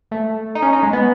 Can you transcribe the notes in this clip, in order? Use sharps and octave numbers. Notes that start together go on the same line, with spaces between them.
A3
D#4
C#4
D#4
G#3
B3